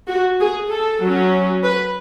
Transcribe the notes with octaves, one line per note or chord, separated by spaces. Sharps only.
F#4
G#4
A4
F#3 C#4
B4